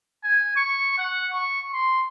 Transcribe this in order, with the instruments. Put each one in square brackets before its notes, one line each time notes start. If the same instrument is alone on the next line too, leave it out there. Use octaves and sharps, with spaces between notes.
[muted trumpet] G#5
C#6
F#5
C#6
C6